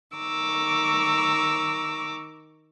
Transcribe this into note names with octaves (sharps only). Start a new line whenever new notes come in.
D#3 A#5 C#6 D6 E6